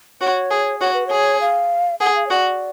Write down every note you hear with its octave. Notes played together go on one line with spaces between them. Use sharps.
F#4 C#5
G#4
F#4 C#5
B4
G#4 C#5
F5
G#4 F#5
F5
C#5
F#4 D5